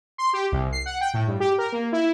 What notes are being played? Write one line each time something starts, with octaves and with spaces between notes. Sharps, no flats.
C6
G4
C2
C7
F#5
G5
A2
G2
G4
A#4
A#3
E4